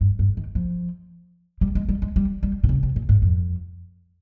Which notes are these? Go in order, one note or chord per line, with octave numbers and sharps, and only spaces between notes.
G2
G2
D#3
F3
G3
G#3
G3
G#3
G3
G3
C3
C#3
C3
A#2
G#2
F2